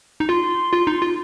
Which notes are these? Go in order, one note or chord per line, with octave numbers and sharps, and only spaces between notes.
D#4
F4 C6
F4
D#4
F4